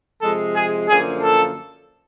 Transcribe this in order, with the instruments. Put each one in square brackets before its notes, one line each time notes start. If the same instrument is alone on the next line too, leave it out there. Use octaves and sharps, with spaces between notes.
[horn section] C3 F3 G#3 [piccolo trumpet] A4
[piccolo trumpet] G#4
[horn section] F#2 D3 F3 A#3 [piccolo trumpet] G#4
[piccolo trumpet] A4